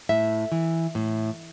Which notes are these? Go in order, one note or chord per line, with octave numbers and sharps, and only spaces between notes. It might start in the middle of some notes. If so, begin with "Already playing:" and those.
A2 E5
E3
A2